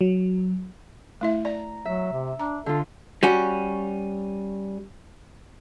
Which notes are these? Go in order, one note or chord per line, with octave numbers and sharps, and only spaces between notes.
F#3
A3 E4 E5
D5 A#5
F#3 E5
C3
D4 A#5
D3 F4 A4
G3 C#4 F#4